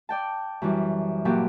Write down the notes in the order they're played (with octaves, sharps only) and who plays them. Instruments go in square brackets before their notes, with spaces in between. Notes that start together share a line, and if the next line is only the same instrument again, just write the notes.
[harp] D5 G5 A5
F#2 E3 G3
G2 A#2 F#3 F#4 G4